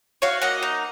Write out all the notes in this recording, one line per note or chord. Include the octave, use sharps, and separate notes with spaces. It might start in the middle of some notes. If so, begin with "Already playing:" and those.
F#4 C#5 F5
A#3 D#5 F#5
D#4